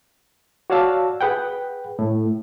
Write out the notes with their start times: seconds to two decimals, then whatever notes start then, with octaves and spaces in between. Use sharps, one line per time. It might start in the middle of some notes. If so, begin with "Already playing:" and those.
0.70 F#4 C#5 D5 F5 A5 E6
1.21 G#4 B4 F#5 G5
1.99 A2